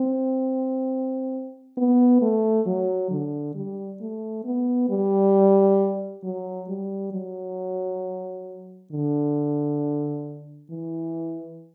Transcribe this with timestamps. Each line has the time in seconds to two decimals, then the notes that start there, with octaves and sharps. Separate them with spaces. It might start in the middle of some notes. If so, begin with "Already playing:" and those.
Already playing: C4
1.77 B3
2.22 A3
2.66 F#3
3.11 D3
3.55 G3
4.01 A3
4.44 B3
4.90 G3
6.24 F#3
6.69 G3
7.13 F#3
8.92 D3
10.71 E3